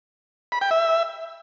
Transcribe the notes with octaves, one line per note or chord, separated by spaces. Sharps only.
B5
G5
E5